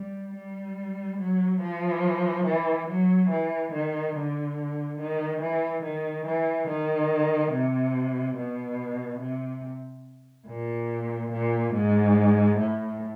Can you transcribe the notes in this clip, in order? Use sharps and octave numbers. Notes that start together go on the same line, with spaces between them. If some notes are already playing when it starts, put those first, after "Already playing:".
Already playing: G3
G3
F#3
F3
E3
F#3
E3
D#3
D3
D#3
E3
D#3
E3
D#3
C3
B2
C3
A#2
A#2
G#2
A2